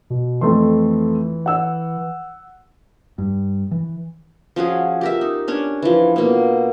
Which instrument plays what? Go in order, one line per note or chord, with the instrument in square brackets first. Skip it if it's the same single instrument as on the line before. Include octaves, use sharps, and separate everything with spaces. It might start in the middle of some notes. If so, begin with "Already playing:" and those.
[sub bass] B2
[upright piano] F2 A3 C6 [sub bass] E3
[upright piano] F#5 E6
[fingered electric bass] G2
E3
[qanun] F3 C#4 F#4 G#4
G4 A#4 E5
D#4
C#4 D4 C#5
E3 F3
B2 A#3